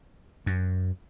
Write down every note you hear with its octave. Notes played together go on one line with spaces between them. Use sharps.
F#2